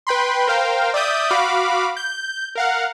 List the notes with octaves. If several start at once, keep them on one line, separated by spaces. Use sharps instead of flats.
B4 G5 B5 C6
A#4 C5 F5 G5
D5 E5 D#6 G6
F#4 F5 B5 D6
G6
A#4 F5 F#5